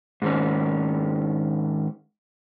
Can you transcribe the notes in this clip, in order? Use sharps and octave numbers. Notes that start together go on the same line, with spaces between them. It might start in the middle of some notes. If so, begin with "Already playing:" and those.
G#2 D#3 C#4